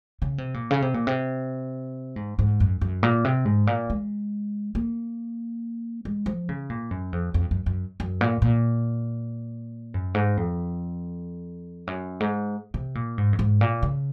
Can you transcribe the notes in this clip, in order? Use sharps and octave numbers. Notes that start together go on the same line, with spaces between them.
C#3
C3
A#2
C#3
C3
A#2
C3
G#2
G#2
F#2
F#2
A#2
C3
G#2
A#2
G#3
A#3
G#3
F3
C#3
A#2
F#2
F2
F2
F#2
F#2
F#2
A#2
A#2
F#2
G#2
F2
F#2
G#2
C3
A#2
G#2
F#2
G#2
A#2
C#3